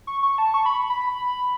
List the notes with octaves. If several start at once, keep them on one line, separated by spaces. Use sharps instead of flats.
C#6
C#6
A5
C#6
B5
B5